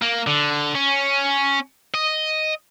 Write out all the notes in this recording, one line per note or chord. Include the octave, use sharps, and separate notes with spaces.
A#3
D3
C#4
D#5